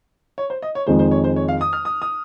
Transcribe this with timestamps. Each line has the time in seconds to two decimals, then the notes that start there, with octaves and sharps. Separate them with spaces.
0.38 C#5
0.50 C5
0.62 D#5
0.75 C#5
0.87 F2 D#3 G#3 C5
0.99 C5
1.11 C#5
1.24 C5
1.36 C#5
1.48 F5
1.61 D#6
1.73 F6
1.85 D#6
2.02 D#6